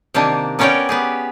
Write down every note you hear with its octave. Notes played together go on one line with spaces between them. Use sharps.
C3 D#3 A#3 D4 D#4
B3 C#4 A#4 C#5 D5 G5
B3 G4 G#4